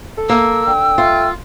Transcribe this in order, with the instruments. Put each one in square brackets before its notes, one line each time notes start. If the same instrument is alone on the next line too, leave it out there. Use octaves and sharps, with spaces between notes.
[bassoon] A4
[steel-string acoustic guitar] A#3 [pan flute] E6
[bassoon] D3 [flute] G5
[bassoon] A3 [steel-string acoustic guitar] F4